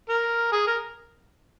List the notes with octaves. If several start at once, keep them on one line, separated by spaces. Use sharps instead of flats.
A#4
G#4
A#4